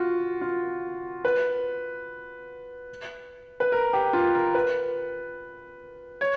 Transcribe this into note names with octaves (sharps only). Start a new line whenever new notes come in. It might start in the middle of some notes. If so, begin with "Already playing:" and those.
Already playing: F4 F#4
F4
B4
B4
A#4
G4
F4
A#4
B4
C#5